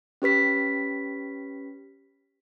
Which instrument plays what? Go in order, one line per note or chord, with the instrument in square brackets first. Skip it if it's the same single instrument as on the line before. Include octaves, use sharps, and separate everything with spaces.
[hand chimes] C#4 G4 B4 B6